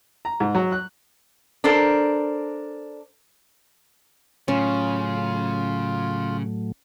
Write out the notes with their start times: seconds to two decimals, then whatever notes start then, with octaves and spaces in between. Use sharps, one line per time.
0.25 A#5
0.40 G#2
0.55 F#3
0.72 F#6
1.64 D4 A4 A#4 C5
4.48 A2 C#3 F#3 A3 C#4 F4